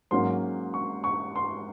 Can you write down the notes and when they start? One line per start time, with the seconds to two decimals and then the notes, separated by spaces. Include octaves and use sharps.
0.11 G#2 F#3 A#3 C#4 C6
0.74 C#6
1.04 C#6
1.35 C6